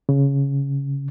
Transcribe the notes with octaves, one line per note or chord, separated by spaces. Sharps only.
C#3